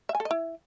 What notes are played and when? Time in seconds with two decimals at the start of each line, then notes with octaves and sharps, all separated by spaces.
0.09 E5
0.15 G#5
0.20 A4
0.25 D#5
0.31 E4